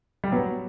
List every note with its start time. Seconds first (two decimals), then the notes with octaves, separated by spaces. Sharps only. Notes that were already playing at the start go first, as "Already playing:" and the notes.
0.24 G3
0.32 F#3 B3